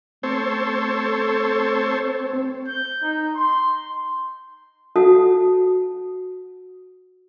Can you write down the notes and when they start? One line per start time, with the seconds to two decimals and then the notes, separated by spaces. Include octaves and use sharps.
0.23 A3 C4 A4 C5 C#5
2.67 G6
3.03 D#4
3.36 C6
4.96 F#4 A4 F#5 A5 D#6